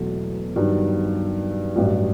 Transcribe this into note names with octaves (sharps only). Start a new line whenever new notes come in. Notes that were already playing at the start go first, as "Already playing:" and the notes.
Already playing: E1 E2 B2 F#3 A3
G2 D#3 F#3
A1 G2 F#3